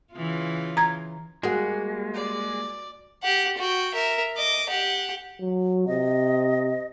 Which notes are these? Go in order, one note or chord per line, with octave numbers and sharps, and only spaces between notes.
C#3 E3 F4
A#5 G#6
G3 G#3 A#3 F#4 G#4 F#5
D5
G4 F#5
F#4 G5
A#4 E5
D#5 D6
G4 F#5
F#3
C3 D#5